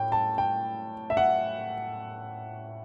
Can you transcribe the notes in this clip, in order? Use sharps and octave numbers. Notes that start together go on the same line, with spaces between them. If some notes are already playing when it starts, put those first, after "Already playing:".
Already playing: A2 G5
A5
G5
E5
F#5